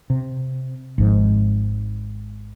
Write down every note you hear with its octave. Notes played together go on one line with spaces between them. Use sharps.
C3
G#1 G#2 F3